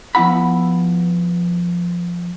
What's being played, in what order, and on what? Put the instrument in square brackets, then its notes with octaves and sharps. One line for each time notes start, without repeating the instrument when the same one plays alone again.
[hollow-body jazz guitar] F3 B3 E4 F#5 B5